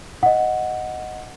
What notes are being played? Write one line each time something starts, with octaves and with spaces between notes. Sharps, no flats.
D#5 F#5